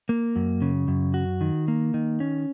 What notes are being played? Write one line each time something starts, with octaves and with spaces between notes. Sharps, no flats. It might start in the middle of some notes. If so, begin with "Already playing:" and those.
A#3
F#2
C#3
F#2
F#4
D#3
A#3
D#3
C#4